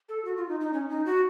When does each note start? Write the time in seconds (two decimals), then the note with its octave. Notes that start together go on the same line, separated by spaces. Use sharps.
0.09 A4
0.25 F#4
0.37 F4
0.49 D#4
0.60 D#4
0.73 C#4
0.90 D#4
1.06 F#4